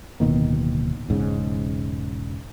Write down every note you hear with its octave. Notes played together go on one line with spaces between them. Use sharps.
D1 B2 D#3 A#3
E1 G#2 C#3